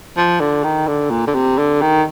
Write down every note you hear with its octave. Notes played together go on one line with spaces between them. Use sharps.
F3
D3
D#3
D3
A#2
D3
C3
D3
D#3